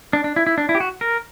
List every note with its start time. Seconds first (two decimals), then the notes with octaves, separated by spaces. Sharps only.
0.13 D4
0.24 D4
0.36 E4
0.47 E4
0.58 D4
0.69 E4
0.75 G4
0.80 F#4
1.01 A#4